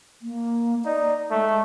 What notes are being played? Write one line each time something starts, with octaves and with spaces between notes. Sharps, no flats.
A#3
D#4 D5
G#3 A3